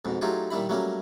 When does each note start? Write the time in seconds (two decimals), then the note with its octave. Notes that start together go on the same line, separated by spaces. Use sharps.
0.05 F2 G#2 B2
0.21 F#3 A3 D#4 F4 G4 G#4
0.50 A#2 D#3 G3 E4 B5
0.69 F#3 G3 A3 A#3 C#4